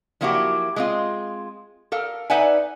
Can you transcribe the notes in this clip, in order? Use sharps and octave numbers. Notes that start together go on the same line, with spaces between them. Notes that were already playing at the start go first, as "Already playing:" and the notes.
F3 F#3 A#3 E4 F#4 G4
G#3 C4 F4
A4 A#4 F5
D#4 B4 D5 E5 F#5 G#5